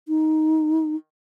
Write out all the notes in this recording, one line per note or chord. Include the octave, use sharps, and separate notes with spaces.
D#4